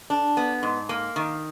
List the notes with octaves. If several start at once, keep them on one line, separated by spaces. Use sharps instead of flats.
D4
B3
G#2
A#3
D#3